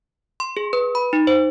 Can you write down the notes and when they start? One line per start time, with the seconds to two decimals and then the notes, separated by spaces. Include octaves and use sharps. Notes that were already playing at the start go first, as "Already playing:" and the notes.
0.40 C6
0.57 G#4
0.73 B4
0.95 B5
1.13 D#4
1.27 C5